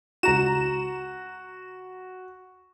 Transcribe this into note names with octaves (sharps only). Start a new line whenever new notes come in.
C#2 F#4 A#5 E7